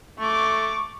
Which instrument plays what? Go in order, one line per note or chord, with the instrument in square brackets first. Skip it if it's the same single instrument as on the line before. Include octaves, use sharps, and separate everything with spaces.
[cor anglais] A3 [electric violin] C#6 D6